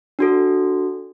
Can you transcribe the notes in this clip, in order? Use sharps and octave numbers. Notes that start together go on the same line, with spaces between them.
D4 F#4 A4